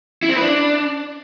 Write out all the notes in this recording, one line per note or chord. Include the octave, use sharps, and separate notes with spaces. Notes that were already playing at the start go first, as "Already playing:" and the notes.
E4
C4
B4
D4